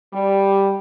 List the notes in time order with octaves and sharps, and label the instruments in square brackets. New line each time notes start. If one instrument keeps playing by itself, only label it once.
[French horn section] G3